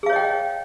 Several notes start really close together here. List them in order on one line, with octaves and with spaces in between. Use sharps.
G#4 F5 C#5 D#5 G5